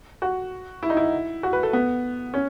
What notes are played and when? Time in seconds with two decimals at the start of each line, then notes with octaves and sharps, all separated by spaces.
0.22 F#4
0.83 E4
0.90 D#4
0.97 E4
1.43 F#4
1.53 B4
1.63 A4
1.73 B3
2.34 C#4